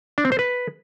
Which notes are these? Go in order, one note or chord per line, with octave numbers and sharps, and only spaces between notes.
D4
C4
C5
B4